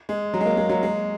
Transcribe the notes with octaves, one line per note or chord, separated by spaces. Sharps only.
G#3
F#3
G#3
A#3
G#3
F#3
G#3